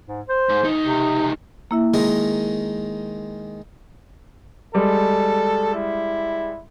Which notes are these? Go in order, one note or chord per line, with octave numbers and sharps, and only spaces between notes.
G#2
C5
G#2
C#2 D#4
C3
A#3 E4 E5
D#3 G#3 A#4
G3 G#3 A4
E4